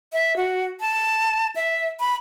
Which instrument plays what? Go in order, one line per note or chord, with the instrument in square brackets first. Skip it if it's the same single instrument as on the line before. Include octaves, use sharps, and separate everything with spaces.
[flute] E5
F#4
A5
E5
B5